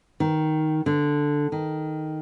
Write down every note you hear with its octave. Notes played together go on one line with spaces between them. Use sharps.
D#3
D3
D#3